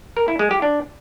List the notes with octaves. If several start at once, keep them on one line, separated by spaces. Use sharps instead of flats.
A#4
E4
G#3
G4
D4